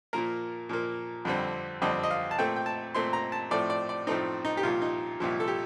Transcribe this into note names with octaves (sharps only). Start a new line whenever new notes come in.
A#2 F3 A#3 A#4
A#2 F3 A#3
F2 D3 G3 C4
F2 D3 G3 C4 D#5
D#5
F5
A5
A#2 A3 C4 G5
G5
A5
A#2 A3 C4 C6
A#5
A5
A2 F3 A3 C4 D5
D5
D5
A2 F3 A3 C4 D#4
D#4
G4
C2 A#2 F3 F4
D#4
C2 A#2 F3
A4
G4